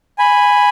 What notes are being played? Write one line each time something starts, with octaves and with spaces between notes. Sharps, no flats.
G#5 B5